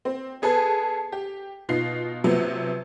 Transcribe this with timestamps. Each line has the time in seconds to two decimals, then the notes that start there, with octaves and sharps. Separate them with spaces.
0.05 C4
0.42 B3 G#4 A4 B4
1.12 G4
1.69 B2 D#4 F4 C7
2.24 C3 F3 F#3 B3